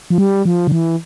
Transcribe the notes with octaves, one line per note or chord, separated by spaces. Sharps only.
F3
G3
F3
D3
E3